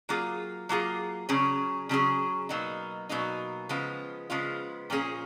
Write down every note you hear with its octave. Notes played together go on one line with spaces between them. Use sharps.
F#3 A#3 F4 G#4
F#3 A#3 F4 G#4
C#3 F#3 C#4 G#4
C#3 F#3 C#4 G#4
B2 F#3 A#3 D#4
B2 F#3 A#3 D#4
C#3 F3 G#3 B3 F4
C#3 F3 G#3 B3 F4
A#2 F3 A#3 C#4 G#4